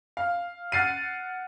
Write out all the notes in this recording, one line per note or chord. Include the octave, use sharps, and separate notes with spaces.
F5
F#5 F6 A6 C7 D#7